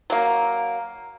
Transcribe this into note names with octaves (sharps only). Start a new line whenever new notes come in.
F#3 A#3